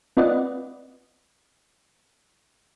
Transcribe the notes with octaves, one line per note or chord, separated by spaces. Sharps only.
C4 F4 B4 D5 D#5 F#5